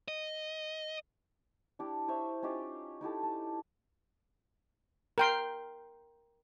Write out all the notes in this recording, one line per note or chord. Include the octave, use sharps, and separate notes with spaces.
D#5
D4 E4 G4
C5 C#5 E5 C#6
C#4 D#4 F4 G4
D#4 E4 G4 A4
A5
A#4 G5 C6